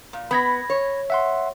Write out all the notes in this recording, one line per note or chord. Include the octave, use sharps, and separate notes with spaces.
A#2
B3 B5 G#6 A#6
C#5
E5 F#5 C6